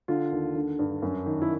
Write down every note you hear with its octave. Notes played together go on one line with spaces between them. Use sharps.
D3 F4
D#2
D3
G2
F#2
D#3
E4